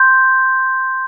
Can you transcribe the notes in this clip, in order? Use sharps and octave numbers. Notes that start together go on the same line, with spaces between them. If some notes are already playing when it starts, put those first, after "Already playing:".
Already playing: C6 G6